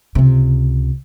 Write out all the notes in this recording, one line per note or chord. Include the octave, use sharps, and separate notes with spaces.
C#2 C3